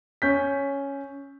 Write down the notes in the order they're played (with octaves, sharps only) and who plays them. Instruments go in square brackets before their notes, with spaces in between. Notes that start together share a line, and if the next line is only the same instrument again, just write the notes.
[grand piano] C#4 G6 B6